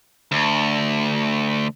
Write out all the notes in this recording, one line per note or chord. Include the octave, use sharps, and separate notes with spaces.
D2